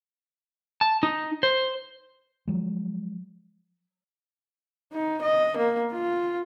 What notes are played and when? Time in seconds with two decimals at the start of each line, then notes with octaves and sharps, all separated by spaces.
0.81 A5
1.03 D#4
1.43 C5
2.48 F3 F#3 G#3
4.93 D#4
5.22 D#5
5.57 A#3
5.92 F4